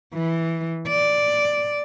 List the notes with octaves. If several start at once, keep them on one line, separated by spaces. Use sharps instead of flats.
E3
D5